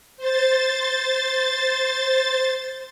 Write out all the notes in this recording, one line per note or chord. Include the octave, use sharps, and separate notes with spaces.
C5 A6